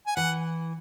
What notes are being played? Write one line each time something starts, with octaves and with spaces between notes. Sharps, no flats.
G#5
E3 F#5